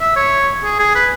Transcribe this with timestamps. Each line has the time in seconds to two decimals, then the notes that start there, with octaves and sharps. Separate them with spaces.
0.01 E5
0.16 C#5
0.64 G#4
0.79 G#4
0.95 B4